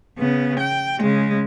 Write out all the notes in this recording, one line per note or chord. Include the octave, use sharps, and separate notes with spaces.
C#3 B3
G5
C#3 G#3